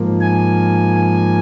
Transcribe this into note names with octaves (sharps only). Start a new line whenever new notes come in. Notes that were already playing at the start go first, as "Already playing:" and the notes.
Already playing: G#2 F3 A#3
G#5